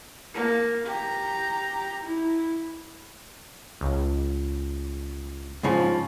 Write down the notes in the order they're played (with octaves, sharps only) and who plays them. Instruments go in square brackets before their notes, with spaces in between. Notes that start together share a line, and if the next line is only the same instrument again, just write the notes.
[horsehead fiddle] A#3
G4 A#5
E4
[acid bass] C#2
[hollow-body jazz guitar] G#2 C#3 F3